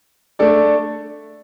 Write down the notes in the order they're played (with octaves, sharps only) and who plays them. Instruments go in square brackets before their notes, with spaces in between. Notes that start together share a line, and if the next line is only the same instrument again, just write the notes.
[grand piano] A3 D4 A4 D5